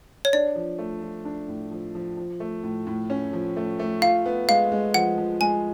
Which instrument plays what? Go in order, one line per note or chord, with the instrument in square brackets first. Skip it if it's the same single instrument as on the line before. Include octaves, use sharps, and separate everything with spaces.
[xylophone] C#5
[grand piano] D4 [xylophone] D5
[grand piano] F3
A3
F3
D4
A2
F3
F3
F3
A3
A2
A2
C#4
F3
A3
A3
[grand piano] F4 [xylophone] F5
[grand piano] B3
[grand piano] G#3 [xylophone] F5
[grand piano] G#3
[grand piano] F3 [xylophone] F#5
[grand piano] F3
[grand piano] G#3 [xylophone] G#5